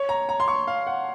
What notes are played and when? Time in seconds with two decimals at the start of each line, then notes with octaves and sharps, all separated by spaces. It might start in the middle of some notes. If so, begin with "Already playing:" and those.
Already playing: C#5
0.09 A#5
0.29 A#5
0.40 C6
0.48 C#6
0.67 F5
0.87 F#5